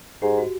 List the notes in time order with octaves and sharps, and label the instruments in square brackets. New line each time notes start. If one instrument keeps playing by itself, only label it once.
[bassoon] G#2 [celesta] G4
[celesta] F#4